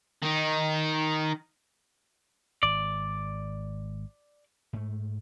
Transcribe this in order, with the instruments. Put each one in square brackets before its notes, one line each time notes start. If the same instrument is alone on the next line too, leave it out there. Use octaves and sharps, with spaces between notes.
[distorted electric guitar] D#3 D#4
[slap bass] G#1 [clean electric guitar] D5
[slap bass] G#2 A3